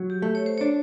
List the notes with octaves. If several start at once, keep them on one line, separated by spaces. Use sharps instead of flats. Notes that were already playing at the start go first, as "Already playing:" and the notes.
Already playing: F#3
G4
A3
C#5
C5
D4 C#5